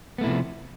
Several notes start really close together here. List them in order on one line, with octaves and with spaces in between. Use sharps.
B3 A3 E4 C3 F3